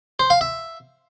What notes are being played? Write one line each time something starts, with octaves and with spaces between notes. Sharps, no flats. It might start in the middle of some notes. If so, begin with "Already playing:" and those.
C5
F5
E5